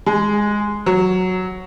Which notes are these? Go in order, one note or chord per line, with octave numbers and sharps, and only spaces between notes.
G#3
F#3